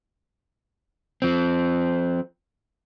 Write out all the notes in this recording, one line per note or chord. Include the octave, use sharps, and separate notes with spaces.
F3 C4